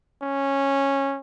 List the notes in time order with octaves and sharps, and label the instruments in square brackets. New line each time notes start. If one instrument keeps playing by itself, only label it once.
[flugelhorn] C#4